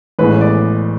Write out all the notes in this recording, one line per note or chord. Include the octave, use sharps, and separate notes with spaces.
A1 A2 G#3 B3 B4
D5